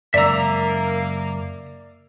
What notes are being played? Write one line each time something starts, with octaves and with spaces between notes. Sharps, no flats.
F#2 C#3 G#3 A#3 D5 E5 A#5 E6